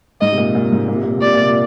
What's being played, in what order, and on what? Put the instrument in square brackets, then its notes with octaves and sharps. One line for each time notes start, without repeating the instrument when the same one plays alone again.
[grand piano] G#2 [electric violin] D#5
[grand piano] C3
A#2
A#2
G#2
A#2
C3
A#2
C3
A#2
[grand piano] C3 [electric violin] D5
[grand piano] A#2
C3
A#2